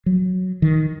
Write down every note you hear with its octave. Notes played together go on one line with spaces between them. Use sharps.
F#3
D#3